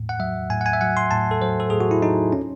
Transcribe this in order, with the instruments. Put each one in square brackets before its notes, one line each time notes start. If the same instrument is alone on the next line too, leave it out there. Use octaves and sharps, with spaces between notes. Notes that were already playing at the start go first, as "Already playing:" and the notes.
Already playing: [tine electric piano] A2
F#5
F#3 E5
A2 G#5
F#5
G#5
E5
F#3 F#5
C6
A2 A5
A4
F#3 C5
A4
A2 G#4
F#4
E4
F#3 D#4
C#4